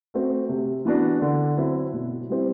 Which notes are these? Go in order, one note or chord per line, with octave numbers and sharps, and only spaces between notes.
A3 C4 F#4
C3
E3 B3 D4 F#4
D3
F#3 C4 E4
B2
G3 C4 E4